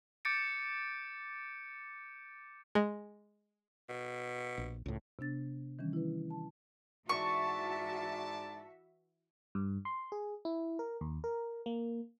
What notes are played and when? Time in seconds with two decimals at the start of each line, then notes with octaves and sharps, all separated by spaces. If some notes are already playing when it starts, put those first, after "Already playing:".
0.25 D6 G6 A6 C#7 D7
2.75 G#3
3.89 B2
4.58 A#1
4.86 C#2 A2
5.19 C3 B3 D4 A6
5.79 D#3 E3 G3 C#4
5.93 E4 B4
6.30 A5
7.09 G#2 E3 F#4 D5 E5 A5 C#6
9.55 G2
9.85 C6
10.12 G#4
10.45 E4
10.79 A#4
11.01 D#2
11.24 A#4
11.66 A#3